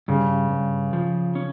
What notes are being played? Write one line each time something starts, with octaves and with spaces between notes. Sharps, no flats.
G2 C#3
G2
F3
C#4